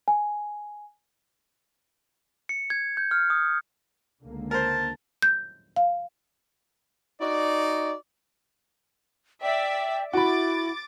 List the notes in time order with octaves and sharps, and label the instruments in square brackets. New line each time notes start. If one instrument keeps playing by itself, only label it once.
[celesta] G#5
[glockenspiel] C#7
G#6
G6
F6
D#6
[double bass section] C#2 D3 A#3
[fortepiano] A#4 C5 [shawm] A5
[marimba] G6
F5
[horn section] D#4 F#4 D5
[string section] D5 E5 [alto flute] G5
[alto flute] E4 [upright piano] F#4 B5 [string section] D6 A6